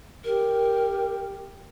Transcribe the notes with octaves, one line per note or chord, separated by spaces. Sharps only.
G4 A#4